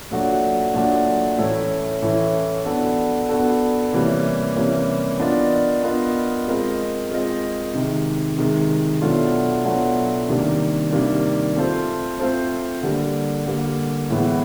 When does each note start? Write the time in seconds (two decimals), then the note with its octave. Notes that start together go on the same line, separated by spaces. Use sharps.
0.11 A#2 F#3 A3 D4 F#4
0.74 A#2 F#3 A3 D4 F#4
1.38 A2 E3 A3 C#4 E4
2.02 A2 E3 A3 C#4 E4
2.65 B3 D4 F#4 A4
3.29 B3 D4 F#4 A4
3.93 C3 E3 G3 A#3 C#4
4.56 C3 E3 G3 A#3 C#4
5.20 B3 D4 F4 A#4 D#5
5.84 B3 D4 F4 A#4 D#5
6.47 G#3 C4 F4 A#4 D#5
7.11 G#3 C4 F4 A#4 D#5
7.74 C3 D#3 G#3
8.38 C3 D#3 G#3
9.01 B2 F#3 A3 D4 F4
9.65 B2 F#3 A3 D4 F4
10.28 C3 D#3 G3 A#3 D4
10.92 C3 D#3 G3 A#3 D4
11.56 A3 C4 F4 A4 C5
12.19 A3 C4 F4 A4 C5
12.83 D3 G3 A#3
13.46 D3 G3 A#3
14.10 A2 E3 G#3 B3